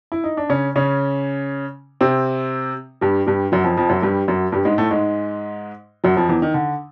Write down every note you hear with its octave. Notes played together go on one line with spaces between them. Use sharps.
E4
D#4
D4
C#3 C#4
C#3 C#4
C3 C4
G2 G3
G2 G3
F#2 F#3
F2 F3
F2 F3
F#2 F#3
G2 G3
F#2 F#3
G2 G3
G#2 G#3
A2 A3
G#2 G#3
F#2 F#3
F2 F3
E2 E3
D#3
D3